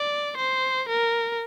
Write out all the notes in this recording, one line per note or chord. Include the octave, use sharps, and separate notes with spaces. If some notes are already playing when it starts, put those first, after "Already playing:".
Already playing: D5
C5
A#4